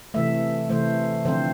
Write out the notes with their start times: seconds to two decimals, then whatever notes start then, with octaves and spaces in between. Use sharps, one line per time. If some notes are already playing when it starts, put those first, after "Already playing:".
0.14 C3 E3 A3 E5
0.70 C3 E3 A3 C5
1.25 D3 F3 C4 C5